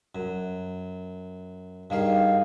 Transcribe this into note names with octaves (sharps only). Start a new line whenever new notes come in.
F#2
G2 D#3 G#4 F5